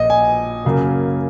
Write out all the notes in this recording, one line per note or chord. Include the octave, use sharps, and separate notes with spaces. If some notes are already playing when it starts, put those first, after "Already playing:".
Already playing: A#1 A#2 D#5
G#5
F#2 C#3 F#3 A#3